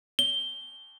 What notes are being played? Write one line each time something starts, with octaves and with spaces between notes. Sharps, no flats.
G7